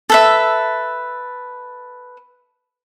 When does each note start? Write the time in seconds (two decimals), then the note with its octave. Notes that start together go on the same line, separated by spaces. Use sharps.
0.10 A4 B4 E5